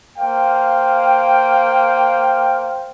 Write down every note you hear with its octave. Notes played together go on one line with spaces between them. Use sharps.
A#3 C5 F5 G5